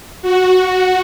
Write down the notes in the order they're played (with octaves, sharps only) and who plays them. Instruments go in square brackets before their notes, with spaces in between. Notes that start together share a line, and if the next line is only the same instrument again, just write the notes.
[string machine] F#4